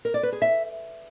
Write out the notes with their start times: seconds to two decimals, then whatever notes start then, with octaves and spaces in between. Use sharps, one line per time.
0.05 A#4
0.14 D5
0.23 B4
0.32 G#4
0.42 E5